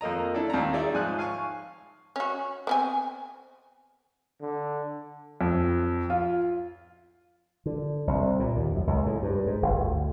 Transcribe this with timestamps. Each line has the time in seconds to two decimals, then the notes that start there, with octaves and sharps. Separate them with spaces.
0.01 F2 A#3 D#5 A#5
0.34 D4 E4 A4 D5
0.50 D#2 A#5
0.73 D#4 G#4 D5 E5
0.93 G#2 F3 G#5 F#6
1.18 F5 G#5 C#6
2.16 C#4 F#4
2.67 B3 C4 G#5
4.42 D3
5.41 F2
6.10 F4
7.66 D3
8.07 C2
8.40 A#2
8.57 D#2
8.75 F#2
8.87 C#2
9.06 A2
9.23 G2
9.47 G#2
9.62 G1
9.76 D2